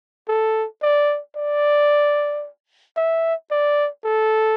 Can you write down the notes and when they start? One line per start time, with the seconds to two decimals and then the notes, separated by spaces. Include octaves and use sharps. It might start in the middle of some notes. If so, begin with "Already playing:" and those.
0.28 A4
0.82 D5
1.36 D5
2.97 E5
3.51 D5
4.05 A4